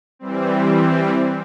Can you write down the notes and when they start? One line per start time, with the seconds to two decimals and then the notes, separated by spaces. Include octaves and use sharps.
0.19 E3 G3 C4